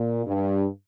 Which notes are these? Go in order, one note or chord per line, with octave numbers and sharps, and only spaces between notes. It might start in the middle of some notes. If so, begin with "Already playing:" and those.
Already playing: A#2
G2